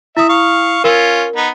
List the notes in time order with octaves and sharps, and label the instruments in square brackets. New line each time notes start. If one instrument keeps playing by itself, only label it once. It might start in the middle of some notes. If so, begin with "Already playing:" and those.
[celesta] E4 D#6 [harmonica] E5
[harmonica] F5 C#6
[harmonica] C#4 F4 [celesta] A#4
[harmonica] B3 D#4